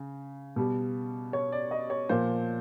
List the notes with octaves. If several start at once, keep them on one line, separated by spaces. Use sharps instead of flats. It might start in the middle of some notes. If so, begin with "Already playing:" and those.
Already playing: C#3
B2 G3
C#5
D5
D#5
C#5
A#2 F3 C5